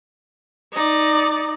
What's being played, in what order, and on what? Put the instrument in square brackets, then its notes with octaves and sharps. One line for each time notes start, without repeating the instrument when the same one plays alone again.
[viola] D#4 D5